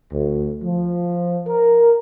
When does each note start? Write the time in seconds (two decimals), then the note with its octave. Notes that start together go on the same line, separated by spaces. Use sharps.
0.12 D2
0.63 F3
1.47 A#4